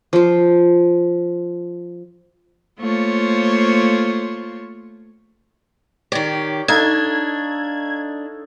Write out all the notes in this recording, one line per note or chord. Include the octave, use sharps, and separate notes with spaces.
F3 C5
A3 A#3 F4 C5 C#5
D#3 G4 C#5 D5
D4 D#4 A4 F5 G#6